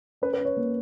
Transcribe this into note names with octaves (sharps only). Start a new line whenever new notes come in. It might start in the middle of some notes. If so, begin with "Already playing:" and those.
C#4 B4
B4
C#4
C#5
A#3